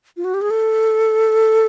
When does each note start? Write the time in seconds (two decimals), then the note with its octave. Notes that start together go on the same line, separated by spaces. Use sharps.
0.17 F4
0.24 F#4
0.34 G4
0.41 G#4
0.50 A4